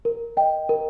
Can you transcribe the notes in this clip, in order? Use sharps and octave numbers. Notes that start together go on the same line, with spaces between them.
A#4
D#5 G5
A#4